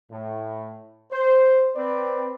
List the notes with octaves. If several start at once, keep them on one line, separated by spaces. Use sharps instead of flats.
A2
C5
C4 B4 D5